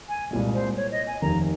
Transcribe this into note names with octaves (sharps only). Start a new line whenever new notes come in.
G#5
C2 A#2 G#3
C5
C#5
D#5
G#5
F1 D#2 D#3 A#5